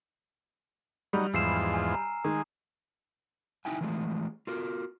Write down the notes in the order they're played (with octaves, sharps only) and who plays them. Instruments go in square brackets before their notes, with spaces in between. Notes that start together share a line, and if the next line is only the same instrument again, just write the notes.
[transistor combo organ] F#3 D#4 [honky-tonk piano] G3
[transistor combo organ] E2 G#2 F3 [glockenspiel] E6 C7 E7
[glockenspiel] F6 E7
G#5
A#5
[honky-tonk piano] D#3 [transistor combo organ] G#3 [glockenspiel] D#6
[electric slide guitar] D#4 E4 G5 G#5
E3 F3 G#3 A3
F4 F#4 A#4